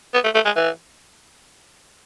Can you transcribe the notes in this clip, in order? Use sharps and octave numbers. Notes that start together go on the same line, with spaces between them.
B3
A3
A3
G#3
E3